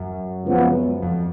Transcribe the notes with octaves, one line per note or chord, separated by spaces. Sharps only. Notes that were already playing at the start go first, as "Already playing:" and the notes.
Already playing: F#2
C#2 C#3 F3 B3
F2